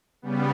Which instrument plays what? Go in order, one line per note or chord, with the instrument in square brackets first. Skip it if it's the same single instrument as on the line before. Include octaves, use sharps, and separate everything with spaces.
[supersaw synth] C#3 G3 B3